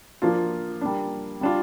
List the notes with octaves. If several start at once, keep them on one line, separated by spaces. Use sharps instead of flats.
F3 A#3 D4 F4
G3 A#3 D4
G3 D4 F4